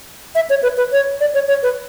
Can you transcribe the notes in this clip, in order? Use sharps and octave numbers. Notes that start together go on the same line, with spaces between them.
E5
C#5
B4
B4
C#5
D5
C#5
C#5
B4